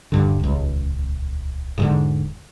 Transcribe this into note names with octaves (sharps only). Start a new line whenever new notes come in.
D#1 G2 D3
D#1 C#2
E1 G#2 D3